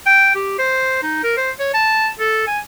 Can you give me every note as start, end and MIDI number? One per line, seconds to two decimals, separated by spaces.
0.06 0.31 79
0.35 0.58 67
0.59 1.02 72
1.03 1.20 63
1.23 1.34 70
1.37 1.51 72
1.59 1.71 73
1.74 2.09 81
2.19 2.43 69
2.47 2.59 80